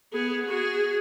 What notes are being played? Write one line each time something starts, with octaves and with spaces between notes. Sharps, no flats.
B3 G#4
F#4 G#4